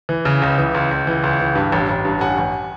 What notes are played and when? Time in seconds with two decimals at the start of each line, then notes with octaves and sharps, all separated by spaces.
0.09 E3
0.25 C#3
0.42 C#2
0.58 E3
0.74 C#2
0.91 C#2
1.07 E3
1.23 C#2
1.40 E3
1.55 G2
1.72 A1
1.89 A1
2.05 G2
2.21 A1 F#5 G#5
2.38 A1